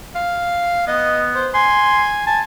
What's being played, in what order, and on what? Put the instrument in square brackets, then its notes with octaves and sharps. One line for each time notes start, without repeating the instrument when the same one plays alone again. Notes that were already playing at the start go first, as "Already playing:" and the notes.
[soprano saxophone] F5
[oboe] B3 [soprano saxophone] D#5
[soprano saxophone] C5
[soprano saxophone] G#5 [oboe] C6
[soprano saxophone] G#5 [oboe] A5